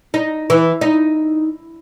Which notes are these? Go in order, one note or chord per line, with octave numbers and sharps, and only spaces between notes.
D#4
E3
D#4